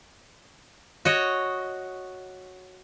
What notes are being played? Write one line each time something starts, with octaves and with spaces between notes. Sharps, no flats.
F#4 C#5 D#5